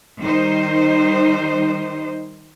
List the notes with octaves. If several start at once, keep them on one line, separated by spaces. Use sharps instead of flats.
D#3 G3 D#4 C5